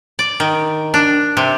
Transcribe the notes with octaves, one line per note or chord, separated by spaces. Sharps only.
D5
D#3
D4
C3